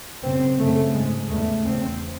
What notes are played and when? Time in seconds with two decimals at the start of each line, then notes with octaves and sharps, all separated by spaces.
0.22 F#2 C#3 C4
0.58 F#2 C#3 A3
0.94 G#2 G#3
1.29 E2 C#3 A3
1.64 E2 C#3 C4